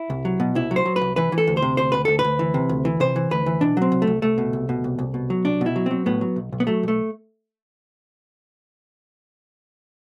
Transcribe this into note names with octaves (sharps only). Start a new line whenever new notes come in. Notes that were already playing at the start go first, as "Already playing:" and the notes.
Already playing: E4
C2
F#3
B2
C2 E4
F#3
C5
F#3
B4
C2
E3 B4
E3
A4
D2
C5
C3
D2 C5
D2 B4
D2 A4
B4
D2
E3
C3
D2
E3
C3 C5
E3
D2 B4
E3
B2 D4
F#3 C4
C2
A3
C2
C2 A3
B2
C2
B2
C2
C2
B2
F#3
C2 D4
B2
E4
F#3
F#3 C4
A2 B3
F#3
B1
B1
B3
F#3 A3
B1 A3